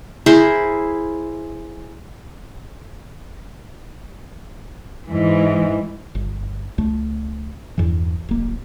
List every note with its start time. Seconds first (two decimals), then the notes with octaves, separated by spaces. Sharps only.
0.26 E4 G#4 A#4 C5
5.07 G#2 E3
6.15 G1
6.78 C#2 A3
7.78 E2 G2 E3
8.29 D1 G#1 A#3